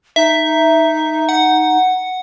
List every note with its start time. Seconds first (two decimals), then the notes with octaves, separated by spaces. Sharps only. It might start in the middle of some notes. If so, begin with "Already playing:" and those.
0.16 D#4 E5
1.29 F#5